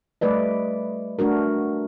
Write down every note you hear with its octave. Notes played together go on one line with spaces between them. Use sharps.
G3 A3 B4 D5 D#5
A3 D4 F#4 A#4